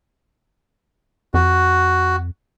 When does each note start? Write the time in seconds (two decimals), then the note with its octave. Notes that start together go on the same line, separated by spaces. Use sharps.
1.34 F2 F#4